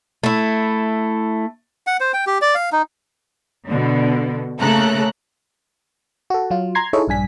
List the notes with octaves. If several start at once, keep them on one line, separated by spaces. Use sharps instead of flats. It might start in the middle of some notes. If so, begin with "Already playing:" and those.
A3 E4
F#5
C5
G5
G4
D5
F5
D#4
B2 D3
C#3 A3 A#3 A4 A#5 F#6
F#4 A4
F#3 F4
A#5 C6 G#6 C7
D#4 E4 G#4 A4 C#5
A#1 G2 D4 G#5 B6